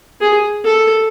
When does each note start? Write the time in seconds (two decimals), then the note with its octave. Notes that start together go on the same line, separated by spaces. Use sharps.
0.21 G#4
0.64 A4